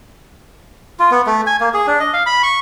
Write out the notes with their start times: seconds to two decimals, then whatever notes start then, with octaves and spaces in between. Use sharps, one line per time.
0.99 F4
1.11 B3
1.26 A3
1.47 G#5
1.60 A#3
1.74 G#4
1.87 D4
2.00 D#5
2.13 F5
2.26 B5
2.43 C#6